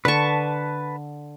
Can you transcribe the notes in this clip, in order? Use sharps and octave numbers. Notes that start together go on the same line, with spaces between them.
D3 B4 A5 C#6